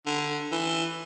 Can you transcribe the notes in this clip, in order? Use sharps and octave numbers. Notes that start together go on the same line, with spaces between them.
D3
E3